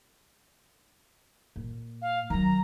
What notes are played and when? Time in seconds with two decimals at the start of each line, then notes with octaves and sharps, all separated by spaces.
1.56 A#2
2.02 F5
2.30 D#3 F#3 A#5